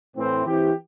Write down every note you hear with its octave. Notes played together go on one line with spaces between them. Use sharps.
A2 E3 C4
E3 C4 E4 G4